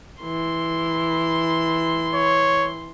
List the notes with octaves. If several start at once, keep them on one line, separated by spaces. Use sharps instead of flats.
E3 C6
C#5